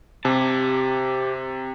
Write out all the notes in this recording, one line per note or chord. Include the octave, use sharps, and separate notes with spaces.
C3 G4 A5